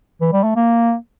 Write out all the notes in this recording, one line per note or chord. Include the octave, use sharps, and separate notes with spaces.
E3
G3
A3
A#3